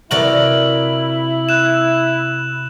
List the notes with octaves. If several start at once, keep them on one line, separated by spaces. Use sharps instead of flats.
C3 E4 F#4 A#4 D5 F#7
F#6 E7